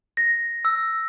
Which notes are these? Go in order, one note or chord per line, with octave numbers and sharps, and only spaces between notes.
A#6
E6